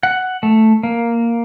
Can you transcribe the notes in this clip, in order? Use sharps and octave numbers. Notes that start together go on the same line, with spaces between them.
F#5
A3
A#3